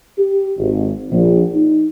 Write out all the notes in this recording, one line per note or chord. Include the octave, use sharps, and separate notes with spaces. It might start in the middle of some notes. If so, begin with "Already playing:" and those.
G4
G#1
A#1
D#4